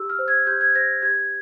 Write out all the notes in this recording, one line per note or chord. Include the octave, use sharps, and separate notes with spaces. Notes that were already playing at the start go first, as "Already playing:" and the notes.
Already playing: G4 E6
F6
C5
G#6
G4 G6
G#6
C5 A#6
G4 G#6